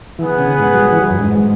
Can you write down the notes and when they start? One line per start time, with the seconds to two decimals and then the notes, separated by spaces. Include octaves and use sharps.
0.19 E3 B3 G#4 B4 F#5
0.39 C#3
0.60 G#2
0.74 F#3
0.79 G#3
0.93 E3
0.99 F#3
1.10 F#2
1.19 G#2